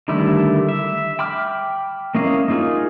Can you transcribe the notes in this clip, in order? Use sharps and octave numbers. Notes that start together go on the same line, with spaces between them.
D3 D#3 G3 A3 E4
E5
G5 B5 D6 F6
A#3 C#4 E4 D#5 F5
A#3 D#4 F4 G#4